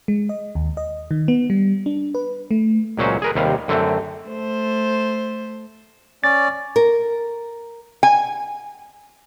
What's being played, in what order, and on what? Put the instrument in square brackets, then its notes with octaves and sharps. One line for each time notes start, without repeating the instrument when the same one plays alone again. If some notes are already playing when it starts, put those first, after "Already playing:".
[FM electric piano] G#3
D#5
D#2
D#5
D#3
B3
G3
D4
B4
A3
[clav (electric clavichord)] C#2 A#2 F#3 C#4 C5
G#4 A#4 B4
D#2 C3 G3 F5
F#2 D3 A3 C4
[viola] A3 C5
[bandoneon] C#4 D5 [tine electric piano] A6
[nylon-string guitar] A#4
[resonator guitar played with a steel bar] G#5